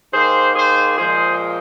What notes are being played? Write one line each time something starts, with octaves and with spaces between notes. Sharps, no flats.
D#3 A#3 G#4 C5
G#4 C5
A#2 F3 G#3 G#4 C5